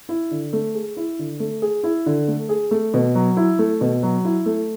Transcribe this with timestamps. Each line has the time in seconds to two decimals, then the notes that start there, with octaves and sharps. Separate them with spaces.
0.09 E4
0.31 D3
0.53 A3
0.75 G#4
0.97 E4
1.19 D3
1.40 A3
1.62 G#4
1.84 E4
2.06 D3
2.28 A3
2.49 G#4
2.71 A3
2.94 B2
3.15 F#3
3.37 E4
3.59 A3
3.81 B2
4.03 F#3
4.25 E4
4.46 A3